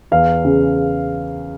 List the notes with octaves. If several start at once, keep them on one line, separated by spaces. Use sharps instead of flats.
E2 F5
C#3